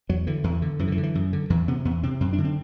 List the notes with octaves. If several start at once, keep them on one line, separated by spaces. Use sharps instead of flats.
E2 F#3
D3 E3
E2 E3
D3
F#2 E3
D3
E3
D3
E3
F#2
D3
E2 E3
C3 B3
E2 B3
C3 C4
F#2 C4
D4
D3
C4